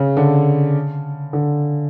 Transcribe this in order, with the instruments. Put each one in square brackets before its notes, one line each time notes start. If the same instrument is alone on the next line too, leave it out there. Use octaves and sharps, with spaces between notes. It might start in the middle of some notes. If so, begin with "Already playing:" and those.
Already playing: [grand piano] C#3
D3
D3